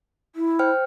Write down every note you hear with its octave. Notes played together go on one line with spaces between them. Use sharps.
E4
C5 G5 F6